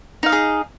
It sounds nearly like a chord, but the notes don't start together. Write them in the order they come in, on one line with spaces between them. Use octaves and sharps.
D#4 F5 D#5 G#4